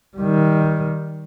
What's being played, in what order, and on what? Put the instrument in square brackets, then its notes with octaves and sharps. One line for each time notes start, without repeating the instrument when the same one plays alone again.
[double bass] D#3 G3